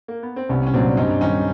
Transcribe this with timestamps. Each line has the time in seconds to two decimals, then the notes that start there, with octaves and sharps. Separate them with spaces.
0.08 A#3
0.23 B3
0.36 C4
0.49 C2 B3 C#4
0.66 C#4
0.74 A#2 F#3 C4 D4
0.97 G2 C#4 D#4
1.21 D#3 G3 C#4 D#4